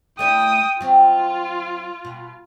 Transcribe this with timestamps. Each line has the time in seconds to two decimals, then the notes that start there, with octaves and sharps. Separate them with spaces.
0.19 A3 D4 E4 G5 D#6
0.81 F#3 C4 F4
2.05 B2